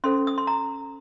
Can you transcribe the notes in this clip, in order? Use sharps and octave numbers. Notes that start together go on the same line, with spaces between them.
C#4 A4 C5 C6
D#6
C6
A#5